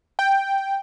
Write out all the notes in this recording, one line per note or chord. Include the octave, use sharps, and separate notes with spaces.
G5